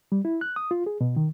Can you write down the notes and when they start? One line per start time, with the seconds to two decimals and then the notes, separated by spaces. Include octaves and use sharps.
0.12 G3
0.25 E4
0.41 F#6
0.56 D#6
0.71 F4
0.86 G#4
1.01 B2
1.16 D#3